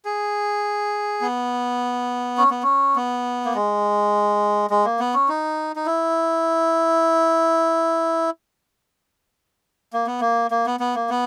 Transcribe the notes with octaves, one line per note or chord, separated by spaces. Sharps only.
G#4
B3
C#4
B3
C#4
B3
A#3
G#3
G#3
A#3
B3
C#4
D#4
D#4
E4
A#3
B3
A#3
A#3
B3
B3
A#3
B3